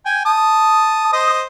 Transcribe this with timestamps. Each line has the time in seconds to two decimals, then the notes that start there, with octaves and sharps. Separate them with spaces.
0.06 G5 G#5
0.25 A5 D#6
1.13 C5 D#5 D#6